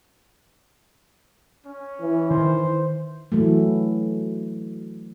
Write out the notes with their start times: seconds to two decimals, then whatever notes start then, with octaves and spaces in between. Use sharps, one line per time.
1.65 C#4
2.01 E3
2.30 D#3 C5
3.32 E3 F#3 A3